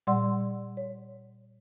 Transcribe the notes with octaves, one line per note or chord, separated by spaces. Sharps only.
A#2 G3 D5 F#5 C6 E6
C#5